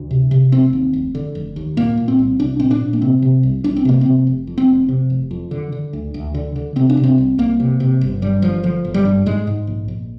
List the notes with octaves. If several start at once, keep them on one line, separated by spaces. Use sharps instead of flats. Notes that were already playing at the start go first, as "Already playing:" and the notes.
Already playing: D2
C3
C3
F1 C4
D#2
F1
D3
F1
D#2
A#2 A#3
A#2
C4
C2
C2 D4
A#2 C4
D4
A#2
A#3
C3 C4
C3
C2
C2 D4
C4
C3 A#3
C3 C4
F1
F2
C4
F1
C3
F1
F2
D3
D3
D2
D2
D3
D3
C3 C4
D4
C3
C4
C2
C2 A#3
C3
C3
G1
G2 G3
G1 F3
D3 F3
G1
G3
G2
G#2 G#3
G#2
A#1
A#1